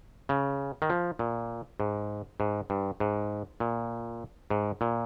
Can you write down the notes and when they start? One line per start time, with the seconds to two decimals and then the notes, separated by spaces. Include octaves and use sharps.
0.29 C#3
0.82 D#3
0.90 F3
1.19 A#2
1.80 G#2
2.40 G#2
2.70 G2
3.00 G#2
3.60 A#2
4.50 G#2
4.81 A#2